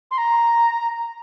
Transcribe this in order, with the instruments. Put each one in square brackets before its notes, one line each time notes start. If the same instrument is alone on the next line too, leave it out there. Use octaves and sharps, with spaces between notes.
[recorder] C6
A#5